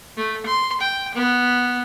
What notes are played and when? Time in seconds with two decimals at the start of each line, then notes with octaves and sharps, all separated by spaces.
0.17 A3
0.46 C6
0.81 G5
1.15 B3